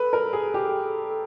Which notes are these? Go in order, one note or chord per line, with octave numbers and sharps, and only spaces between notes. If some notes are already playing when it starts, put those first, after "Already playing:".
Already playing: A4 B4
A#4
G#4
G4